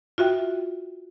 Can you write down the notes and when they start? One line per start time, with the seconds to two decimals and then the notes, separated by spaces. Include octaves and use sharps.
0.18 F4 F#4 E5 G5